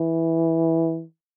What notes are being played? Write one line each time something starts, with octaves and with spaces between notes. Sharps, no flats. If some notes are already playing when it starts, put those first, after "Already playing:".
Already playing: E3